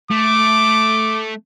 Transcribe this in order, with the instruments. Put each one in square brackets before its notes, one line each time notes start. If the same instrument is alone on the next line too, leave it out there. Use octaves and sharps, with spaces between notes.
[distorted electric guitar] A3 [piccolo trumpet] D6